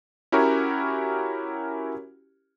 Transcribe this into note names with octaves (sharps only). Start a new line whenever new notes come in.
C#4 E4 F#4 G4 A#4 C#5